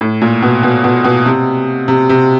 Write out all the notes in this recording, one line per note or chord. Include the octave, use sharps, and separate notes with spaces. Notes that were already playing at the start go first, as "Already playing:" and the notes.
A2
A#2
B2
B2
B2
B2
C3
C3
C3